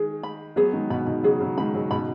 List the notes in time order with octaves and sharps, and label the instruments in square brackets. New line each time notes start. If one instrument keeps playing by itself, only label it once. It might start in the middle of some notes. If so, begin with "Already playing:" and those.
Already playing: [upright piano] D#3 G#3 [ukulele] G#4
[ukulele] B5
[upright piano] F#3 B3 [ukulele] G#4
[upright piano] D#3 G#3
[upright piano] B2 D#3 [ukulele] B5
[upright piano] B2 D#3
[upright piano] C#3 F#3 [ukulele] G#4
[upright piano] C#3 F#3
[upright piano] D#3 G#3 [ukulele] B5
[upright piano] C#3 F#3
[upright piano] B2 D#3 [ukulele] B5